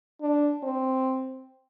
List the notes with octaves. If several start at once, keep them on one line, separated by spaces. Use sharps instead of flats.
D4
C4